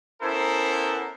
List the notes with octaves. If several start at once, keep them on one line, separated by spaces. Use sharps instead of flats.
B3 C#4 E4 A4 A#4 C5